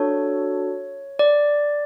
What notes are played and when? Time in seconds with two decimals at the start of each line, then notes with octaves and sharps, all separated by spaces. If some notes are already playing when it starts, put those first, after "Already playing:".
Already playing: D4 F#4 A4 C#5
1.19 D5